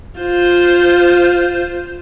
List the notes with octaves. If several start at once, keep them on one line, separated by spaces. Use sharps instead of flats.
F4 C5